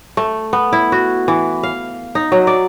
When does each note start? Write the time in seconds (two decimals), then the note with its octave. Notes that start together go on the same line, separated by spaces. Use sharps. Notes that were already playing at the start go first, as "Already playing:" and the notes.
0.17 A3
0.53 B3
0.73 E4
0.92 F#4
1.28 E3
1.63 F5
2.15 D#4
2.32 F#3
2.47 D5